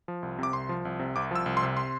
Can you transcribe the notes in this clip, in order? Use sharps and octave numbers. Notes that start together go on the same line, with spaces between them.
F3
C2
C3 D6
C2 C6
F3
C2
C3
C2 D6
F3 E6
C2
C6
C3
C6